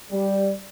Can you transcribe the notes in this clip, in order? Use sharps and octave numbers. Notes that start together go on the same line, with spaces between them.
G3